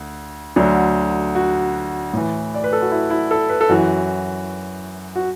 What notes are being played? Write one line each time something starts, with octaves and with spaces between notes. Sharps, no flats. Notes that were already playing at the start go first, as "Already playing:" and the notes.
Already playing: D2
D2 D3 F#3
F#4
A2 E3
D5
B4
A4
F#4
E4
E4
A4
B4
A4
F#2 E3 F#4
F#4